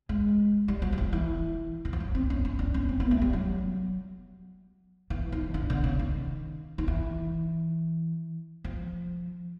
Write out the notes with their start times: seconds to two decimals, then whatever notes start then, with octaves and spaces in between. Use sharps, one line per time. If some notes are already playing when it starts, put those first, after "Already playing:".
0.09 G#3
0.68 G3
0.82 F#3
0.93 F#3
0.98 F3
1.13 E3
1.85 E3
1.93 F3
2.00 F#3
2.15 C4
2.30 C#4
2.45 C#4
2.59 D4
2.74 C#4
2.89 C4
3.00 B3
3.11 A3
3.22 G3
3.33 F#3
5.10 E3
5.32 D#3
5.54 D3
5.70 D3
5.84 C#3
5.99 D#3
6.78 D#3
6.88 E3
8.64 F3